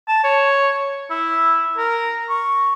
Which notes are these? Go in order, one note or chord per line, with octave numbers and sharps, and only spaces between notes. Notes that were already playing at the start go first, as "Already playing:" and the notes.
A5
C#5
E4
A#4
C#6